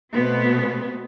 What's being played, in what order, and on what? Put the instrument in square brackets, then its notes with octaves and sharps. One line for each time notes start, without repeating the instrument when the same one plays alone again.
[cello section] B2 A3 B3 C4